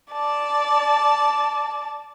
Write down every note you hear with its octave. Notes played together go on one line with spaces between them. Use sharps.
D5 A5